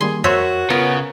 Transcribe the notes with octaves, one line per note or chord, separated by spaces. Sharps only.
D#3 G3 A#3 G#4 C6
F2 F#4 A#4 C5 C#5 E5
C#3 B3 F4 A#4